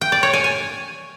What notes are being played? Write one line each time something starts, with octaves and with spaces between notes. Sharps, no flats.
G5
D5
C#5
G#5
G#5